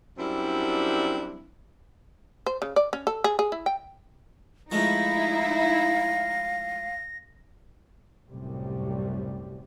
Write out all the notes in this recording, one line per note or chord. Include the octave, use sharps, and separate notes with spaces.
F#2 G3 C4 D4 E4
C5
C#3
D5
C#4
A4
G#4
G#4
E4
G5
F3 G#3 A3 D#4 E4 F5 A#6
C2 F#2 A2 C3 G3